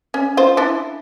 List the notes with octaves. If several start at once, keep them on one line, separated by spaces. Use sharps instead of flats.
C#4
F4 C5
D4 E4